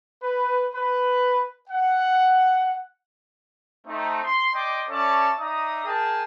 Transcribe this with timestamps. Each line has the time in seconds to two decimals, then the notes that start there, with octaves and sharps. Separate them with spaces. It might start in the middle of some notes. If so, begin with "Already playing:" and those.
0.22 B4
0.73 B4
1.70 F#5
3.86 A3 C4 D#4
4.24 C6
4.52 D5 D#5 G5 C6 D6
4.88 C#4 A4 C#5 D5 E5 A5
5.37 D#4 D5 E5 A#5 D#6
5.85 G#4 A#4 G5 A5